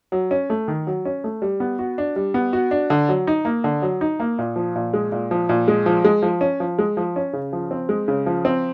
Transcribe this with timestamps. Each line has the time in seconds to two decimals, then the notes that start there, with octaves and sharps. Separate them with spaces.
0.12 F#3
0.31 C#4
0.50 A3
0.68 D#3
0.87 F#3
1.05 C#4
1.24 A3
1.42 G3
1.60 B3
1.79 F#4
1.98 D4
2.16 G3
2.34 B3
2.53 F#4
2.71 D4
2.90 D3
3.09 F#3
3.27 D#4
3.45 A#3
3.64 D3
3.82 F#3
4.01 D#4
4.20 A#3
4.39 A#2
4.56 F3
4.76 A#2
4.94 G#3
5.12 A#2
5.31 F3
5.49 A#2
5.68 G#3
5.86 F3
6.05 G#3
6.22 F3
6.41 C#4
6.60 F3
6.79 G#3
6.97 F3
7.16 C#4
7.33 C#3
7.53 F3
7.71 C4
7.89 G#3
8.08 C#3
8.26 F3
8.45 C4